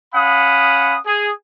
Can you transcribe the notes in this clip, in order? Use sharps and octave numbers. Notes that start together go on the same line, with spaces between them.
C#4 F5 F#5 B5 D#6
G#4